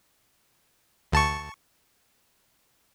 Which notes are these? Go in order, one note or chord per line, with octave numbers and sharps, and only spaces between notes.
D2 A5 C#6